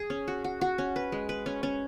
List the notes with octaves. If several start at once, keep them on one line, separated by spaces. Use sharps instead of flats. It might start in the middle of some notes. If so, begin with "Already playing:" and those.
Already playing: G#4
C#4
F#4
F#4
F#4
C#4
B4
G#3
B4
C#4
C#4